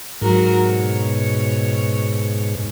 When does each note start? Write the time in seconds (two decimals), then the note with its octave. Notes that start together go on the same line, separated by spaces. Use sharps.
0.22 G#2 F#3 F#4 A#4
0.62 B2 C#5